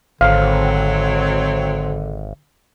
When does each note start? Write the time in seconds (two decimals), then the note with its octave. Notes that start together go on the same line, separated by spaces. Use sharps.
0.21 G#1 D3 F#3 C4 F5